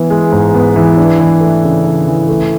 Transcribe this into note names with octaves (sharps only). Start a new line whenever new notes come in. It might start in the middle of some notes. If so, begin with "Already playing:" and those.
Already playing: E3 B3
G#3
G#2
B3
E3
D4
E3
A3
C#3
D4
E3
A3